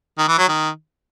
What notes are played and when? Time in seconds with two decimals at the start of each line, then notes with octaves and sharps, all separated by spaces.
0.18 D#3
0.28 E3
0.38 F#3
0.48 D#3